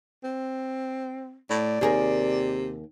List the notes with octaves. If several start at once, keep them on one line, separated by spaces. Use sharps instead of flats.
C4
A2 D5
D#2 C3 G#4 A#4